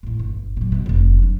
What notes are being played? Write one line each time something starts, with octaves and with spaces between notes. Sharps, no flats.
A#1 A2
G1
A#2 F#3
B1 B2
F1 D3
F#3 D4